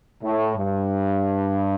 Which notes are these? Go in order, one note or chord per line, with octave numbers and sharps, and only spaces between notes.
A2
G2